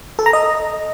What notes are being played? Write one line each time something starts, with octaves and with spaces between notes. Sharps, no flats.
A4
A#5
D#5